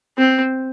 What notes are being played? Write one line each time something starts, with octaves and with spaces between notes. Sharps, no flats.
C4